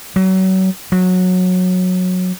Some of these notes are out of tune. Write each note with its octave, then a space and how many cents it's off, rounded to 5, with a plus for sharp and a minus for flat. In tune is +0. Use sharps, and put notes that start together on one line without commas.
F#3 +30
F#3 -15